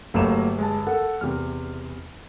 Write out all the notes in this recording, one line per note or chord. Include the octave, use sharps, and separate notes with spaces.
G1 F#3 A3 A#3 E7
G#3 A5
A4 F#5
E2 C3 F6